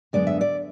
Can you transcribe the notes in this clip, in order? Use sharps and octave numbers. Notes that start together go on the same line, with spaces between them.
F#2 D3 G#3 B3 D4 D5
E5
D5